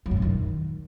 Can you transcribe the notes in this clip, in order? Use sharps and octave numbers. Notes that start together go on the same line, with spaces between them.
F#3
F#2
A#2
D#3